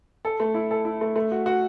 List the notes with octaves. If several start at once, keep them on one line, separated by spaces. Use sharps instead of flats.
A4
A3
E4
A4
E4
A3
A3
F#4
F#4